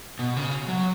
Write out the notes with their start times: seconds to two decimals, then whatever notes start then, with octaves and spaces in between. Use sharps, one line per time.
0.19 B2
0.36 C#3
0.68 F#3